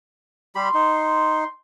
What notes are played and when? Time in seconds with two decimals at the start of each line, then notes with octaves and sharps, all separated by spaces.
0.55 G3 G4 B5 C6
0.74 D#4